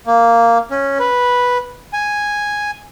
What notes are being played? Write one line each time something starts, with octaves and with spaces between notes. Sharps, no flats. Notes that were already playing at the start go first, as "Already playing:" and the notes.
A#3
C#4
B4
G#5